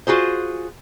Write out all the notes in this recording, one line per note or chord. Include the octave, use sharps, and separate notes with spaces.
F4 F#4 G#4 C5